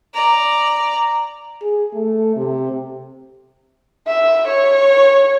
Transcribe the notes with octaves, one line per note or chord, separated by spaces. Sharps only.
D5 A#5
G#4
A3
C3
E5
C#5